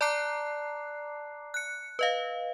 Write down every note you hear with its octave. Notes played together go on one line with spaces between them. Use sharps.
D5 A5 A#5 D6 F#6 C7
F#6 C#7
B4 D#5 F5